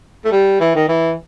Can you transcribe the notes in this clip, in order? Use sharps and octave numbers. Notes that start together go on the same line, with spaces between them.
A3
G3
E3
D#3
E3